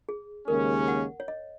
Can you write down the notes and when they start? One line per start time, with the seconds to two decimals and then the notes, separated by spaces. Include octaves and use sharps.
0.09 G#4
0.48 D#2 C#3 G#3 C#4 A#4
0.88 F#5
1.20 C#5
1.28 D#5